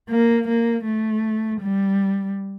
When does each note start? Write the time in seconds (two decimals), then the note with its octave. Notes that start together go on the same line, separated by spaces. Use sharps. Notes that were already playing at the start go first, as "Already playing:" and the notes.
0.10 A#3
0.48 A#3
0.85 A3
1.61 G3